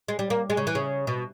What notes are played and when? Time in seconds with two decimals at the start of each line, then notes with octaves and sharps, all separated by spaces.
0.08 G#3
0.19 G3
0.30 A#3
0.50 G#3
0.57 C#3
0.67 E3
0.75 C#3
1.07 B2